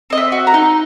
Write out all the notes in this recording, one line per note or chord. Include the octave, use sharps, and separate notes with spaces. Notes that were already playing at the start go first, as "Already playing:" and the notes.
C4 D#5
E5
F#4
A#5
D#4